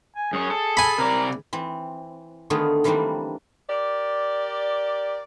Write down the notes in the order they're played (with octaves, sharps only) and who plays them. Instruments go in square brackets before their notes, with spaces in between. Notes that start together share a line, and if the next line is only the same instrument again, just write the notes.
[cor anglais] G#5
[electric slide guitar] F#2 C#5 [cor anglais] G#4
[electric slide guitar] A4
[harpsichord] G#5 B5
[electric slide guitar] C3 D5 [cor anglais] A#4
[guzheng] E3 C4
D3 D#3 A3 B3 F4 G#4
D#3 E3 G3 A#3 C4 D4
[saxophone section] G4 A#4 D5